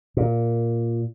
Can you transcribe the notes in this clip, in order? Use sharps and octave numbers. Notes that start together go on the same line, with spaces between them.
A#2